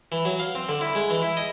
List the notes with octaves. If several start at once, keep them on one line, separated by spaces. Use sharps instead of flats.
E3
F#3
F5
C4
D3
E4
G#3
E3
E4
D#5